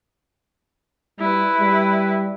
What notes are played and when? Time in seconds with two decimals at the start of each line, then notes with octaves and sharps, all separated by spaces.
1.19 G3 E4 B4
1.61 G3